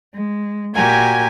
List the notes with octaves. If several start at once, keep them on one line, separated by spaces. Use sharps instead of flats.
G#3
A#2 F#4 G4 A#4 G#5 G#6